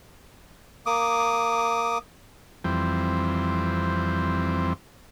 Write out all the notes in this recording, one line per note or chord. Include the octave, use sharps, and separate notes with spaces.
A#3 D6 D#6
F2 E3 G3 C4